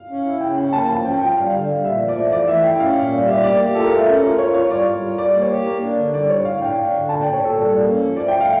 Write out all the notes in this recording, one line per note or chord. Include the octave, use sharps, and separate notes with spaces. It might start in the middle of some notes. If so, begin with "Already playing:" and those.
Already playing: F5
C#4
E4
C#3 G5
C#4 G5
A#3 A5
F3 A5
C#4 G5
F4 G5
G3 F5
D3
G3
A#2 E5
F3
D5
A3
E3 D5
A3 E5
E4 G5
C#4 F5
A#2
G3
G4 E5
A#3 D5
G4
F4 A4
A#4
A3 A4
C#4
F4 A#4
F4 C#5
F4 C#5
G3 D5
G3
F4
G3 D5
A#3
C#5
G4
A#3 A#4
D4
D3
G3 D5
A2 C#5
A2 F5
D4 G5
D4
D3
A#2 A5
A#2 G5
C#5
A#2 A4
G3 A4
A#3
C#4
F3
A3 D5
G5
A3 F5